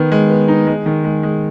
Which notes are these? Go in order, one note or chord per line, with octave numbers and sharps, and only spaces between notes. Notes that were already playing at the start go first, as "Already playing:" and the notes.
Already playing: D#3 B3
G#3
B3
D#4
G#3
D#3
G#3
G#3